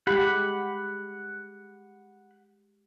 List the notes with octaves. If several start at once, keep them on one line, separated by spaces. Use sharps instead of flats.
G#3 G4 F#5 B5